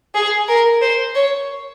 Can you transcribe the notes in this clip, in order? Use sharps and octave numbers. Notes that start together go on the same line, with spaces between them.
G#4
A#4
C5
C#5